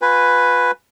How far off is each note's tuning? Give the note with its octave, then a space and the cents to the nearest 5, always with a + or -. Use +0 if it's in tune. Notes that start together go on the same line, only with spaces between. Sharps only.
F4 +35 B4 +5 G#5 -15